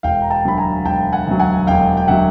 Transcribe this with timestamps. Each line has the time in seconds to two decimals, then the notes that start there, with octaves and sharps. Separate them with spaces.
0.03 E1 F5 G5
0.22 A#5
0.31 G5 A5
0.45 D2 D3 F#3 B5
0.58 G#5 A#5
0.85 E1 G5 A5
1.12 F#5 G#5
1.27 D2 D3 F#3
1.40 F#5 G#5
1.67 E1 F5 G5
1.97 G5
2.08 D3 F#3 E5 F#5